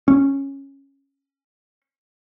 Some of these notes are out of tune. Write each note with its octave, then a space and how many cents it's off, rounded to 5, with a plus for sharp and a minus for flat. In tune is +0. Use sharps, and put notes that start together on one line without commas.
C#4 -10